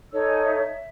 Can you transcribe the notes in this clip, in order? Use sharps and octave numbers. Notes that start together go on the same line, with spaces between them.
D#4 A4 C#5 E6
G#5
E5